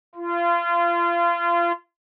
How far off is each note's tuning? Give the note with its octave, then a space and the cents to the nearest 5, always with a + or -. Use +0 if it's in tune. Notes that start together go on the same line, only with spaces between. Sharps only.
F4 -30